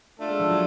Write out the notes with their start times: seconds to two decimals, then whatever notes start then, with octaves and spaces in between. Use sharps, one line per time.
0.18 A3 D4 F4 A4
0.29 G#3
0.39 F3
0.50 F#3